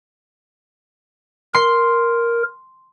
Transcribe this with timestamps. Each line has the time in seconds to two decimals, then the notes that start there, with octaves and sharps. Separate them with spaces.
1.54 A#4 C6 C7